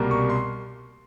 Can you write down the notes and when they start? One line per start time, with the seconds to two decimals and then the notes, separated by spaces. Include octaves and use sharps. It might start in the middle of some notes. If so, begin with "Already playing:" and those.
Already playing: C2 B2 G3 A#3
0.11 C#6
0.30 C6